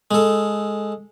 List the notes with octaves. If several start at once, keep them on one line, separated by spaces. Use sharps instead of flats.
G#3 A4